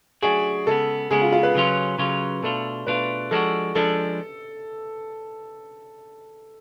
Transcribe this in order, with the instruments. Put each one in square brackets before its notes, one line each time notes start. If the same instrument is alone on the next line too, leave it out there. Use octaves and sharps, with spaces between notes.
[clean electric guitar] F#3 A3 D4 F#4 [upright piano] G#4
[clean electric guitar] C#3 G#3 B3 [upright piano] A4
[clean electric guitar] C#3 G#3 B3 [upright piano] G#4
[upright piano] F4
F4
B4
[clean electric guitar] C#3 F#3 C#4 F4
C#3 F#3 C#4 F4
[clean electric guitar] B2 A3 D4 F4 [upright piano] A4
[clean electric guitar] B2 A3 D4 F4 [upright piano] B4
[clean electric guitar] F3 G#3 D4 F#4 [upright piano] A4
[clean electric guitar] F3 G#3 D4 [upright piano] A4